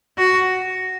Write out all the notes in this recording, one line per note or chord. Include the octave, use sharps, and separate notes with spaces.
F#4